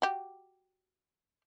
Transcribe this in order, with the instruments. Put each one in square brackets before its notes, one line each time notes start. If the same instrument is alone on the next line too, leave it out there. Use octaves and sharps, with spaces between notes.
[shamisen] F#4 G4